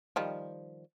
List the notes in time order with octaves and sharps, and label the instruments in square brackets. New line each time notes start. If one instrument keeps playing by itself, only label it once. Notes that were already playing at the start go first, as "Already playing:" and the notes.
[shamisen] D#3 F3 G3